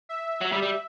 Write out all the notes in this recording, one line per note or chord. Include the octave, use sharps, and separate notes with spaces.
E5
F#3
G3
G3